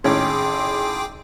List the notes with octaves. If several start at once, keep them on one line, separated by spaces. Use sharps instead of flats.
G#1 A2 C#4 G#4 G5 C6 D6